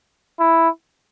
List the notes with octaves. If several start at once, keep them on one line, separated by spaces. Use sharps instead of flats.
E4